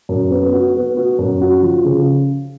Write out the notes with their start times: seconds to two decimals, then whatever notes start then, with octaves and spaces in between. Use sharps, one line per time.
0.09 F#2
0.31 B3
0.53 F#4
0.76 B3
0.97 F#4
1.19 F#2
1.41 F#4
1.63 F3
1.85 C#3